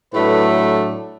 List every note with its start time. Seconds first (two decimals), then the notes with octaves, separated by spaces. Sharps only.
0.14 A2 F#3 A3 D4 B4